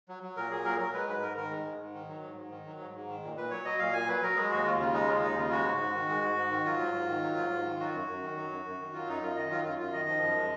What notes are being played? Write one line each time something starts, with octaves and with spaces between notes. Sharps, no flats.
F#3
F#3
A#2 A#4
A#2 G#4
F#3 A#4
F#3 A#4
G#3 B4
G#2 B4
G#2 A#4
D#3 A#4
G#3
G#2
G#2
D#3
F#3
G#2
G#2
D#3
F#3
G#2
G#2
D#3
A#2
A#2 B4
F#3 C#5
F#3 D#5
A#2 F5
A#2 G#5
F#3 B4
F#3 A#4
G#3 G#4
D#2 F#4
D#2 F4
C#3 F4
G#3 D#4
D#2 F4
D#2 D#4
C#3 F4
G#3 F#4
G#2
G#2
D#3
G#3
G#2
G#2
D#3
F#3 F4
G#2
G#2
D#3
F#3
G#2
G#2
D#3
F#3 F#4
F#2
F#2
D#3
F#3
F#2
F#2
D#3
F#3 F4
F#2 D#4
F#2 F4
D#3 D#5
F#3 F4
F#2 F4
F#2 F4
D#3 D#5
F3
F#2
G#3